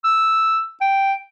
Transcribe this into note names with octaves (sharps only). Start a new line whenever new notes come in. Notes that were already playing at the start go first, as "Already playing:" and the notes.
E6
G5